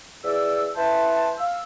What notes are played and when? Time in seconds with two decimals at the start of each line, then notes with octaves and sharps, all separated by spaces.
0.24 E2 D5 E6
0.75 E4 B4 C5 A5
1.38 F5 E6